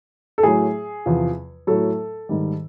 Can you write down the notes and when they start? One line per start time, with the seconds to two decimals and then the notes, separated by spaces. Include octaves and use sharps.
0.38 A4
0.43 A2 F#3 G#4
1.06 E2 C3 F3
1.67 A2 F#3 A4
2.29 G#2 D#3 G3